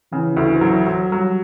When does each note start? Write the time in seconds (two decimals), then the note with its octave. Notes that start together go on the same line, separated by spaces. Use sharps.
0.12 C#3 E3
0.37 D2
0.61 F#3
0.86 F#3
1.12 F#3 G3